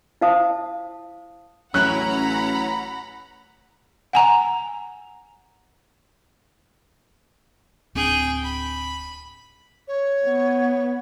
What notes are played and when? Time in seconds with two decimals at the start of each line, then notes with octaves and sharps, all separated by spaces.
0.21 E4 C5 F5 A5 D#6
1.74 A1 F#3 C#4 E4 F#5 A#5 B5 F#6
4.13 F#5 G#5 A#5
7.95 D1 C4 D4 G#4 G5
8.43 B5
9.88 C#5
10.25 B3